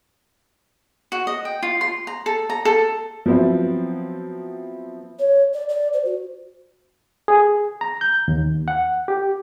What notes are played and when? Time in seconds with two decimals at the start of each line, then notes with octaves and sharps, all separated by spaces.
1.12 F#4
1.27 D#5
1.45 G5
1.63 F4
1.81 C6
2.07 A#5
2.26 A4
2.50 A#5
2.65 A4
3.26 F3 F#3 B3 C4 E4
5.19 C#5
5.54 D5
5.69 D5
5.93 C5
6.05 F#4
7.28 G#4
7.81 A#5
8.01 G6
8.28 D#2
8.68 F#5
9.08 G4